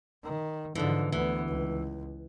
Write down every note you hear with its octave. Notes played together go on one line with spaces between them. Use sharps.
D#3
G#2 D3 E3 F3
D2 E3 B3
C#2